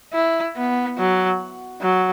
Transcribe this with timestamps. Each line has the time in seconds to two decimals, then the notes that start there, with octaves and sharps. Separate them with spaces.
0.13 E4
0.56 B3
0.98 F#3
1.82 F#3